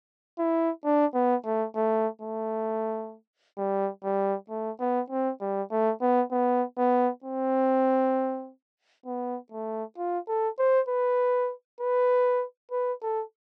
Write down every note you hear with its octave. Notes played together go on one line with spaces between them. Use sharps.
E4
D4
B3
A3
A3
A3
G3
G3
A3
B3
C4
G3
A3
B3
B3
B3
C4
B3
A3
F4
A4
C5
B4
B4
B4
A4